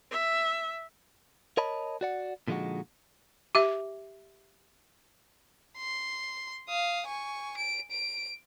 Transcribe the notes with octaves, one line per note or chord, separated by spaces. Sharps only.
E5
A#4 C#5 D#5 A5 B5
F#4 D5 F#5
A#2 D3 F3 G#3 D#4 F#4
G4 E5
C6
F5 D#6
G#5 C#6
D7
D7